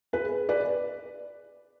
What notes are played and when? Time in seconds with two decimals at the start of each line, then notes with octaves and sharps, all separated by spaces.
0.13 G#4 B4
0.49 B4 D5